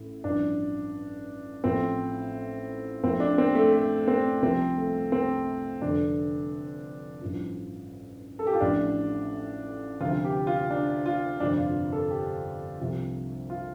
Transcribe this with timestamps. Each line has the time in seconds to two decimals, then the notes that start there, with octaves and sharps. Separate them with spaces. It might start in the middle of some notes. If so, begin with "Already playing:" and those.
Already playing: A1 A2
0.24 A1 G2 F3 D4
1.64 A1 A2 F3 C4
3.04 A1 A2 F3 C4
3.20 D4
3.38 C4
3.55 A3
3.73 A3
4.08 C4
4.42 C2 C3 F3 C4
4.77 A3
5.12 C4
5.82 F1 F2 D3 D4
7.21 A1 G2 F3
8.39 A4
8.47 G4
8.53 F4
8.61 A1 A2 F3 D4
10.00 D2 C3 F3 F4
10.25 G4
10.47 F4
10.70 D4
11.06 F4
11.40 G1 F2 C3 D4
11.58 F4
11.92 A4
12.11 G4
12.80 C2 C3 F3
13.50 F4